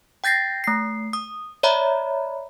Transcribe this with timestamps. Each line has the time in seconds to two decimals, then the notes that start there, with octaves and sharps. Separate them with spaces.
0.24 G5 G6 A6 A#6 C7
0.64 A3 C7
1.13 D#6
1.63 C#5 D5 E5 A#5 B5